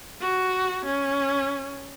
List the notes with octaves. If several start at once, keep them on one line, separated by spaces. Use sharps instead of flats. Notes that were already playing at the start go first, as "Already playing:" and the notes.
F#4
C#4